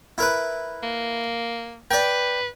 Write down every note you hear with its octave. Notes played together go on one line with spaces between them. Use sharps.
E4 A#4 B4
A#3
B4 D5 G5